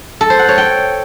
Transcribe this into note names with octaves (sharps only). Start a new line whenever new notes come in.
A4
C5
F#5
C#5
G5